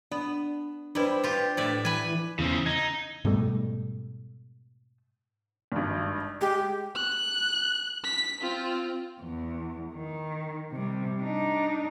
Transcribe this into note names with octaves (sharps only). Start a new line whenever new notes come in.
B3 D4
G3 D4 E4 B4 C5
F4 G4
A2 D5 E5
E3 B4 G#5
E2 C#3 C4
D#4 G#6
G#2 B2 G3 A3
G#1 G2
G#3 G4
F#6
B6
C4 F4
E2
D#3
C3 G3
D4 D#4